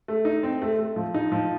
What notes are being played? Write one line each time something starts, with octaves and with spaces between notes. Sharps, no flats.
A3
D#4
C4
A3
A3
F3
D#4
F3